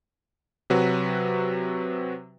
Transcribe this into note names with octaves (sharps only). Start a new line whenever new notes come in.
C3 F#3 F#4 B4